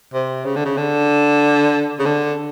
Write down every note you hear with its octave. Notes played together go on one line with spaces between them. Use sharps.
C3
C#3
D3
C#3
D3
C#3
D3